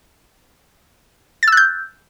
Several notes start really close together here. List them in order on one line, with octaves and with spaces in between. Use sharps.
A6 E6 F#6 G6